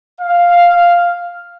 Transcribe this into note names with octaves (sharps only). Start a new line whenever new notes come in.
F5